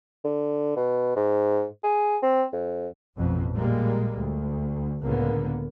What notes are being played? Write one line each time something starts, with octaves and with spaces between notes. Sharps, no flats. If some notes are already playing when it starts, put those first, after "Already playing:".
D3
B2
G#2
G#4
C4
F2
A1 F2 B2
A#2 G3 G#3 A#3
D2
C#2 A2 D3 A#3 B3